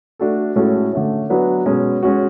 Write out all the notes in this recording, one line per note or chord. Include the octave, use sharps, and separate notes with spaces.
A3 D4 F#4 A4
A2 G#3 C#4 F#4 A4
D3 A3 C#4
F#3 B3 D4 F#4 C#5
B2 G#3 C#4
G#3 C#4 F#4